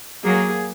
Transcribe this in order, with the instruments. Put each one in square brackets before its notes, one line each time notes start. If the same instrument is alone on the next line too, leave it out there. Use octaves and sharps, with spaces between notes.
[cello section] F#3 A#3 [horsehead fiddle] G#4